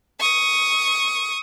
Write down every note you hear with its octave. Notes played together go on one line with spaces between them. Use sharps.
C#6 D#6